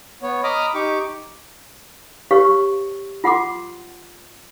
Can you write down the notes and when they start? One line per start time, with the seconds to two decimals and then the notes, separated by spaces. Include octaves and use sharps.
0.22 B3 C#5
0.44 D#5 A#5 B5 D6 D#6 F6
0.74 D#4 G4 C#6 D6
2.31 G4 B4 C#5 F5 C#6
3.24 F4 F#5 C6 D6